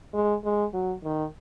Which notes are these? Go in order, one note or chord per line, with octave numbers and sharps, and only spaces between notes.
G#3
G#3
F#3
D#3